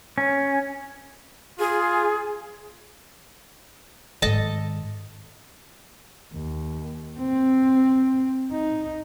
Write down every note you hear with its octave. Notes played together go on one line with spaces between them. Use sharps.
C#4
F4 G#4
G#2 D#3 A4 D#5 A5
D#2
C4
D#4